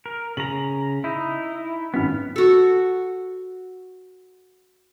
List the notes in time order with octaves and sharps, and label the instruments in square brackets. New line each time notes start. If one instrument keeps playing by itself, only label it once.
[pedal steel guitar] A#4
[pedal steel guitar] C#3 A#5 [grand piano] F#7
[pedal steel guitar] D#4 E4
[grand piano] G#1 F#2 [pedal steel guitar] B3 F6
[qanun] F#4 A4